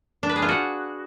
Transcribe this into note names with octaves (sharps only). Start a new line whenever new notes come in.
D4
B4
G#4
F4
F#4